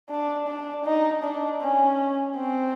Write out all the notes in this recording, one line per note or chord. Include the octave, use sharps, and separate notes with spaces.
D4
D4
D#4
D4
C#4
C4